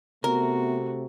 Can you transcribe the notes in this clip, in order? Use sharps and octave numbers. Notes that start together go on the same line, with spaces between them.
C3 A3 B3 F#4 A#4